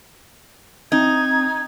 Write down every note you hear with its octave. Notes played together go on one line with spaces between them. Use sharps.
C4 D#4 G#6